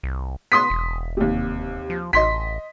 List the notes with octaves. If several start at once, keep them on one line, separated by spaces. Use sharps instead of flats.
C2
B3 C6 D#6 B6
E1
D#2 C3
F3
A1 D#5 C6 B6